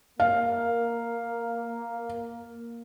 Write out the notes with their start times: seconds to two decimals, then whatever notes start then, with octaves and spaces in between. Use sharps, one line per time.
0.20 A#3 F5